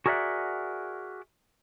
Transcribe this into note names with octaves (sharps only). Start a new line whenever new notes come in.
F#4 G#4 A#4 D5 E5 F#5